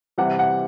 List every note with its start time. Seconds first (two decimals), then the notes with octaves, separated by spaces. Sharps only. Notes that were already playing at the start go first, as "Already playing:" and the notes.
0.18 C3 E3 G3 F#5
0.39 F#5